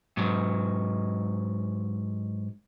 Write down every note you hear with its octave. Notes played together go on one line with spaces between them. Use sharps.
G#2 F#3